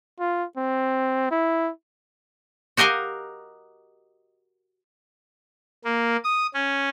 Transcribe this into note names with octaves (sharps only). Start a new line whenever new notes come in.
F4
C4
E4
F#4 G4 A#4 D#5 F5
A#3
D#6
C#4